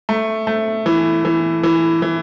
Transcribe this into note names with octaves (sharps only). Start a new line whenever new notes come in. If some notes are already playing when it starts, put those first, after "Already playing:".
A3
A3
E3
E3
E3
E3